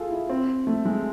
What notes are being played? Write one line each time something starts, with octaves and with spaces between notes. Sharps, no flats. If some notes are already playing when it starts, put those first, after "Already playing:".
Already playing: F4 G#4 A4
E4
C4
A3
G#3